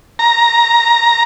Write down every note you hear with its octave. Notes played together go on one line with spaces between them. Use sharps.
A#5